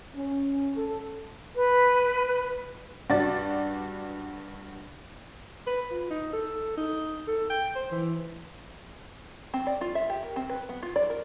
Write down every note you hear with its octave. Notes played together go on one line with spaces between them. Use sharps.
C#4
A4
B4
G2 F#4 D5 A6
B4
F4
D#4
A4
D#4
A4
G5
C5
E3
C4
D5
F4
E5
G4
A#4
C4
B4
B3
F4
D5
A#4